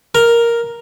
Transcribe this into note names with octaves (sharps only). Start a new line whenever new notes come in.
A#4